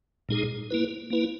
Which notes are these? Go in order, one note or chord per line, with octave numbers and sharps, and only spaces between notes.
A#2 G#3 D#4 G#4
A#3 E4 B4
A#3 E4 B4